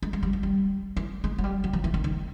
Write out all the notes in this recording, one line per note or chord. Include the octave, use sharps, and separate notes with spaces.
G#3
G#3
G3
F3
G3
E3
G#3
F#3
G3
F#3
F3
E3
D#3
D#3